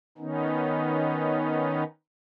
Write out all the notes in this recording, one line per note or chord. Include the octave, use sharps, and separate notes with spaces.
D#3 B3 C#4 D#4